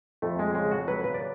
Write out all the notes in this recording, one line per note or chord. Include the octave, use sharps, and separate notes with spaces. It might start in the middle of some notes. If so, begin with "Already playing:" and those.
F2 A3
G#3
C#3 G#3
F#4
F#3 B4
B4
D5